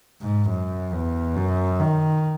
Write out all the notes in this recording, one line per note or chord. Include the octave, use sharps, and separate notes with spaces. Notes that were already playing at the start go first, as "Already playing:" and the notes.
G#2
F#2
E2
F#2
D#3